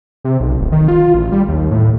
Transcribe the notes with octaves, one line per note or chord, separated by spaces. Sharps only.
C3
B1
D1
D#3
F4
A1
G3
D#2
A2